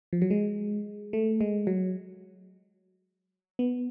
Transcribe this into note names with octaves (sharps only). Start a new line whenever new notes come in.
F3
F#3
G#3
A3
G#3
F#3
B3